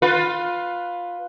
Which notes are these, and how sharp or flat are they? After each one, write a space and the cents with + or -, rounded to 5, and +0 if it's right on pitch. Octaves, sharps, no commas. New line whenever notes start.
F4 +15 B4 +5